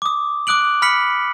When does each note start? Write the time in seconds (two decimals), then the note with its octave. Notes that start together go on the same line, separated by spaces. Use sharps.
0.02 D6 D#6
0.47 D6 D#6 F#6 D7 F#7
0.82 B5 F6 B6 C#7 F#7